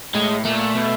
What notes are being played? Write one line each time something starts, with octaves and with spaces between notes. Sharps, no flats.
A2 G#3
A#2 A3
B2